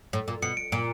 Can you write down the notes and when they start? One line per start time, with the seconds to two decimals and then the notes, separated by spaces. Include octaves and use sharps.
0.13 A2
0.28 A#2
0.42 B2 C#7
0.57 D7
0.72 A#2 D7